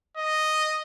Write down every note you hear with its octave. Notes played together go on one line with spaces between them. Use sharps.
D#5